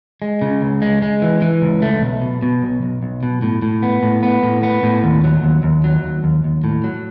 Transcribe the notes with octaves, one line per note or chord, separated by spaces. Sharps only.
G#3
C#3
C#2
G#3
G#3
E3
E3
C#2
A3
B1
B2
B2
B1
B1
B1
B2
A2
A2
B3
A2
B3
A2
B3
A2
D#2
F#3
D#2
D#2
F#3
D#2
D#2
D#2
A2
F#3